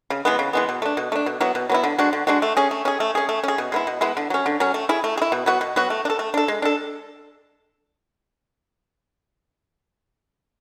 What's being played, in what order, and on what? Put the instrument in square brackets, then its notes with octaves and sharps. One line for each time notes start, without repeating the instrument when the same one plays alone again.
[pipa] C#3
E3 G#3 B3
C#3
E3 G#3 B3
B2
A3 D4
B2
A3 D4
B2
F#3 B3 E4
B2
F#3 B3 E4
D3
G#3 D4 F#4
D3
G#3 D4 F#4
A3
C#4 G#4
A3
C#4 G#4
A3
C#4 G#4
A3
C#4 G#4
B2
G#3 B3 E4
B2
G#3 B3 E4
D3
F#3 C#4
D3
F#3 C#4
A3
E4 G#4
A3
G#4
E4
B2
F#3 B3 F#4
B2
F#3 B3 F#4
A3
D4
A4
A3
D4 A4
G#3
D4 A4